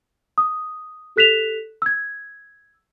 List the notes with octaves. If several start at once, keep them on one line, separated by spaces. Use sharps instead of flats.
D#6
G4 A4 F#6 B6 E7 F7
E6 G#6